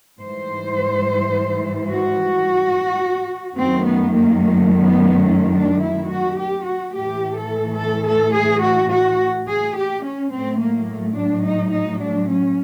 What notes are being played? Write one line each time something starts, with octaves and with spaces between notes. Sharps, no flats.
G#2 E3 G3 C5
F#4
F#2 D#3 F#3 A3 C4
B3
A#3
A#3
B3
C#4
D4
E4
F#4
G4
F#4
A2 E3 A3 G4
A4
A4
A4
G#4
F#4
F#4
G#4
G4
C#4
A2 F#3 A3 C4
A#3
A3
D4
D#4
D#4
D4
C#4